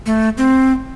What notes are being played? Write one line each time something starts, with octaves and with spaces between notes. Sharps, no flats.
A3
C4